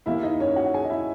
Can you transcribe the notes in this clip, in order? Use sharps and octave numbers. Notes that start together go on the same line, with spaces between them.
D#2 D#3 A#3 E4 E5
D#4 D#5
C#4 C#5
F#4 F#5
G#4 G#5
D#5
E4 E5